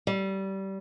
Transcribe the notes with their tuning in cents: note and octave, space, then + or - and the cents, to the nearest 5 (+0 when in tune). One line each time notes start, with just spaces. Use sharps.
G3 -20